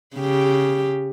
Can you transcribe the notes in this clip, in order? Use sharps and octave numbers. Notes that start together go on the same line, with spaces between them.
C#3 G4